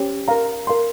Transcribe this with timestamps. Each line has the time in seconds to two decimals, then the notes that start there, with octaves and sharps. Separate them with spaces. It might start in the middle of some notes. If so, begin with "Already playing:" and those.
Already playing: C#4 G4 C5
0.28 A#4 F5 A#5
0.67 A#4 F5 C6